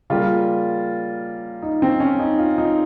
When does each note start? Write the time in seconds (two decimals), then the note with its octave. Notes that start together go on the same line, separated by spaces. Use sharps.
0.10 C#3 G3 A#3 F4
1.62 D#4
1.82 C4
2.00 C#4
2.19 D#4
2.39 F4
2.58 D#4